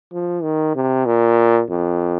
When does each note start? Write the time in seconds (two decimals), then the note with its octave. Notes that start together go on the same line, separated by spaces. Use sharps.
0.13 F3
0.43 D#3
0.75 C3
1.06 A#2
1.70 F2